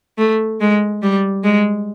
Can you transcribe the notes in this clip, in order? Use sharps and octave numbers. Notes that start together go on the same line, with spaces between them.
A3
G#3
G3
G#3